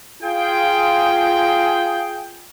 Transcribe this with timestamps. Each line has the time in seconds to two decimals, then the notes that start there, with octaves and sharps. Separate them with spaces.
0.23 F4 G#4 G5